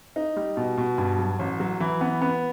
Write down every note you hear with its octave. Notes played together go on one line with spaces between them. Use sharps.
D#4
G3
B2
B2
G2
F#3
A1
F#3
E3
B3
B3